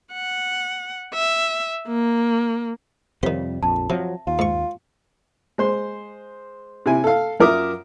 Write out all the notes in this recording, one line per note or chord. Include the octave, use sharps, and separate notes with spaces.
F#5
E5
A#3
F2 C3 D#3 G3 C5 C#5 F5
A#1 F2 A5
C3 F3 F#3 E5
D#2 F4
G#2 C#6
G#3 C5 C6
C3 E4 G#5
A4 F5
F#2 F4 A#4 E5 D6 D#6